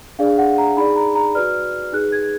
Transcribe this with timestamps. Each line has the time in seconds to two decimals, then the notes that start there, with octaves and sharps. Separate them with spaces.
0.19 D4 G#4 D5 F5
0.38 F#5
0.58 A#5
0.77 D#4 G#4 D5 B5
0.96 A#5
1.15 A#5
1.35 F#4 B4 D5 F6
1.93 D#4 G#4 B4 F#6
2.12 G#6